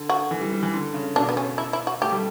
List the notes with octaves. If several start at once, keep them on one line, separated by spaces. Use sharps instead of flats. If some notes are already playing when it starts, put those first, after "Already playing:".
Already playing: D3
F#4
E3
G3
G3
E3
D3
C#3
B2 D4
B3
C#4
E4
E4
F#4
A3 G4
G3